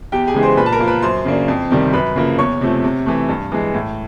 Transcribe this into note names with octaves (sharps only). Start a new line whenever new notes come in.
E2 G4 G5
G#4 G#5
C#3 E3 G#3
C5 C6
A#2 B4 B5
A5
A#4 A#5
F3 A#3
B4 B5
F#2 C5 C6
C#3 F#3 A#3 D4
F2
C3 D#3 G3
F#2 B4 B5
C#3 F3 A#3
E2 C#5 C#6
C3 F3 A3
C3
E3 A3
G2
E3 G#3
A2